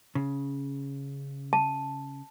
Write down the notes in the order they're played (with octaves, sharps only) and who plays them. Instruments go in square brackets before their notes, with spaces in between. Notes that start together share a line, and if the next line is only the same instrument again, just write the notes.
[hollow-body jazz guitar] C#3
[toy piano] A5